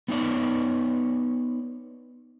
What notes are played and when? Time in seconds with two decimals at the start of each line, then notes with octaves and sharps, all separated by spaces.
0.08 B3 D#4 C#5 D5